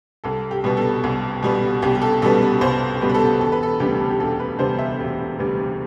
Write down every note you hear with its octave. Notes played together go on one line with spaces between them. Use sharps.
C2 A4
G4
B2 G3 B3
A4
C2
B2 G3 B3
C2 G4
G4
A4
B2 G3 B3 A4
B4
C2 C5
B2 G3 B3
B4
A4
E1 A4
B4
A4
D2 C3 G3 B3 G4
G4
E1 A4
B4
D2 C3 G3 B3 C5
E5
E1
D2 C3 G3 B3